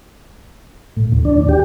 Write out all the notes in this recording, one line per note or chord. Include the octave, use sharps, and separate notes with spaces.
A2
D#2
D4
G4